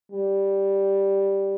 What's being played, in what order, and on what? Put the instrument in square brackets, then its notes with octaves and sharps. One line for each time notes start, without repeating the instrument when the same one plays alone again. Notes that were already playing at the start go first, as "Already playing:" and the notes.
[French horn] G3